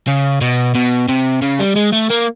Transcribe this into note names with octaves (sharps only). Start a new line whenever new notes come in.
C#3
B2
B2
C3
C#3
G3
G#3
A3
A#3